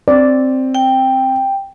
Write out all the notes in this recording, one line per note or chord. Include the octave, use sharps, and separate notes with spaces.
C4 D5
G5